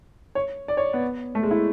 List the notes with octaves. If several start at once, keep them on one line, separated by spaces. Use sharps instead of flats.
C#5
D5
C#5
B3
A3
G#3
E4